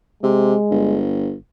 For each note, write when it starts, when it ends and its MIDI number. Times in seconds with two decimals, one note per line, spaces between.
0.23 0.55 48
0.23 1.00 56
0.70 1.35 31